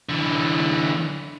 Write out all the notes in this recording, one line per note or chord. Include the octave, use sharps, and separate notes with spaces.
D3 E3